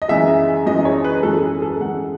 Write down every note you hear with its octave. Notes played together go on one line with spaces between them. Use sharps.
D#5
F#2 E3 G#3 E5
F#2 E3 G#3 D#5
C#5
B4
F#2 E3 G#3 A4
G#4
A4
F#2 E3 G#3 F#5